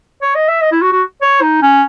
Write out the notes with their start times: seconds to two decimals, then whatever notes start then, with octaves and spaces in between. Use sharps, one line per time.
0.22 C#5
0.35 D#5
0.48 E5
0.61 D#5
0.72 E4
0.81 F#4
0.92 F#4
1.22 C#5
1.42 D#4
1.62 C#4